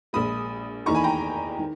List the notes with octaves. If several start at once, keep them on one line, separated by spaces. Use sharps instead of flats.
A#1 A#2 G#3 B5 D#6
E2 D#3 A#3 D#4 A#5 C#6
G#5 B5
G5 A#5
D#3